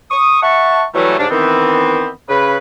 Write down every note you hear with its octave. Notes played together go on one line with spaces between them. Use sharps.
C#6 D#6
E5 F#5 A5 C#6
E3 F#3 G3 A3
G#2 C#3 G3 C#4 D4
D#3 E3 B3 C4
C#3 B4